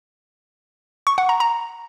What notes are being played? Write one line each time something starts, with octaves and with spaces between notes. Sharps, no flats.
C#6
F#5
A#5
A#5